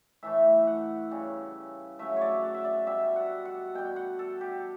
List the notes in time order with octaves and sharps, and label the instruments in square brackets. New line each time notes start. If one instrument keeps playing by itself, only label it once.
[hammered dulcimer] A2 E3 A3 E5
F#5
C#3 G3
C#3 F#3 A3 E5
C#5 D5
F#5
E5
D5
B2 G3 E5
F#5
F#5
B2 G3 G5
F#5
A4
G4